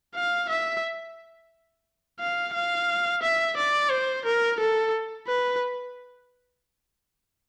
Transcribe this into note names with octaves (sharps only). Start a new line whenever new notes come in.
F5
E5
F5
F5
E5
D5
C5
A#4
A4
B4